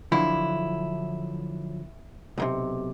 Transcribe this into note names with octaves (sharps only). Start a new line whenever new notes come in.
D3 F3 F#3 E4
B1 A2 C3